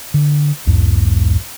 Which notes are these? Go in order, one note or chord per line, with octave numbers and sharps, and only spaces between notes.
D3
B1 E2 G#2